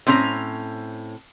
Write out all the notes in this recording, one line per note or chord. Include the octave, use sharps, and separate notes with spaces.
A2 C4 C#4 F4 A#5